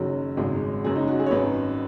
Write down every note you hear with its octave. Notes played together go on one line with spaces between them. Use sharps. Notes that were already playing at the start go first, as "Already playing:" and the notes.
Already playing: F#1 F#2 D#3 F#3
G#1 F#2 C#3 G#3
F#1 F#2 F#3 G#4
D#4
F#4
G#4
C#5
G#1 F#2 D#3 F#3 B4